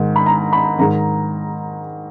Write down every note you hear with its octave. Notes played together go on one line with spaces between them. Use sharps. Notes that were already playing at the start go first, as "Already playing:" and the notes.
Already playing: G#2 D#3
B5
A#5
B5
G#2 D#3 A#5